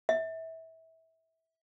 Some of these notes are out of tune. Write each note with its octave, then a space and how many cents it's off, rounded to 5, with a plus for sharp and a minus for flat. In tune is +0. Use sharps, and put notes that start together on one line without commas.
E5 -25